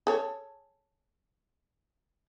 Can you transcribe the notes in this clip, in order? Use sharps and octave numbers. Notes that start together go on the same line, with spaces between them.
G#4 A4 C#5